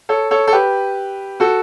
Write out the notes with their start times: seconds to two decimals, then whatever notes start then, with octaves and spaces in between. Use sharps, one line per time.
0.09 A4 C#5
0.31 A4 C#5
0.48 A4
0.53 G4 B4
1.40 F#4 A4